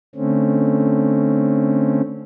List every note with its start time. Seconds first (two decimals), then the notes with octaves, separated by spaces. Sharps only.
0.15 D3 A3 C4 C#4